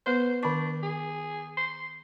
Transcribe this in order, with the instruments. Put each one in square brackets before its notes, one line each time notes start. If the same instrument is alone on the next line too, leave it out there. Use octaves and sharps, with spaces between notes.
[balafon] B3 B4 [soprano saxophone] C5
[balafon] D#3 C#6 [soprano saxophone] D4
[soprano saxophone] G#4
C6